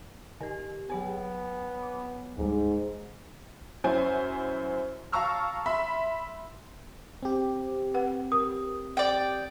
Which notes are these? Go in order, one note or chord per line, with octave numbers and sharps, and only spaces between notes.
D3 G4 A#4 G#5
F#3 B3 G#4 C#5 G#5
D6
D2 G#2 G3
F#2 C#4 E4 C5 G#5
F5 A5 A#5 C#6 E6 F6
E5 B5 C6
C4 G4
B4 F#5
A#4 D#6
D5 G5